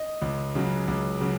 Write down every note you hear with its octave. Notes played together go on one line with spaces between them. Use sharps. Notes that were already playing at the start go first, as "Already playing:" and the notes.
Already playing: D#5
C#2
C#3 F#3
C#2
C#3 F#3